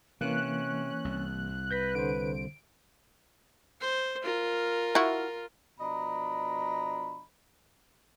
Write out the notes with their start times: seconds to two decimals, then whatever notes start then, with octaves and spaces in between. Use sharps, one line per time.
0.21 C3 E3 A#3 C#4 F#6
1.05 C2
1.71 B4 G6 A#6 B6
1.95 D3 C5 D7
3.80 C5
4.23 F4 A#4
4.95 E4 F#4
5.79 B2 F3 D4 D#5 A#5 B5